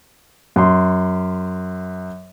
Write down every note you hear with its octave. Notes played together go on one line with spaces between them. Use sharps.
F#2 C6